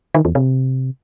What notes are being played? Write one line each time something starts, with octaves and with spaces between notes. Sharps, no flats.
D#3
E2
C3